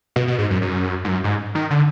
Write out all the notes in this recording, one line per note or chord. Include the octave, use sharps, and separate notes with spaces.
B2
B2
G#2
F#2
F#2
G#2
F#2
G#2
D#3
D3